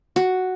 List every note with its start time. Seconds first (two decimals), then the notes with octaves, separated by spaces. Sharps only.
0.16 F#4